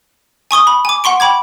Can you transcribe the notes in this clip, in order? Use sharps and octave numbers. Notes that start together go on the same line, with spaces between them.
G#5 C#6 D#6 G7
B5
G#5 D6
F#5 C6 C#6 D7
G5 B5 D6 G#6